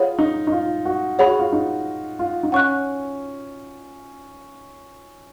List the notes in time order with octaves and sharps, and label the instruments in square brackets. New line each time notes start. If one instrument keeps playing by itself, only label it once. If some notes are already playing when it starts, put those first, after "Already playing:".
Already playing: [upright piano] F4 [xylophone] G#4 C#5 F#5 B5 D#6
[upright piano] D#4
D#4
F4
F#4
[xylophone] G#4 C#5 F#5 B5
[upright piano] F#4
F4
D#4
F4
D#4
[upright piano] C#4 [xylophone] F#5 C#6 F#6